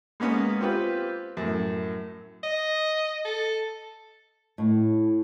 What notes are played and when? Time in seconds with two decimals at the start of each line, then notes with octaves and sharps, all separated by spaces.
0.20 G#3 A#3 B3 C#4
0.61 C4 F4 G4 B4
1.37 F#2 A2
2.43 D#5
3.25 A4
4.58 A2